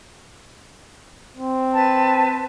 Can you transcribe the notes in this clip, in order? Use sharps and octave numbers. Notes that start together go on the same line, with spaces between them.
C4
B4 A5